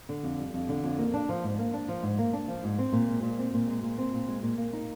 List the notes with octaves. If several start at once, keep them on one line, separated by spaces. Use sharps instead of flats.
D3
F2
G3
F2
D3
F2
A#3
D4
F3
G#2
A#3
D4
F3
G#2
A#3
D4
F3
G#2
C4
A#2
G#3
A#2
C4
A#2
G#3
A#2
C4
A#2
G#3
A#2
A#3
D#4